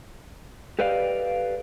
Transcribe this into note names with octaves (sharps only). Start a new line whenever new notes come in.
G4 A4 B4 D5 D#5 F5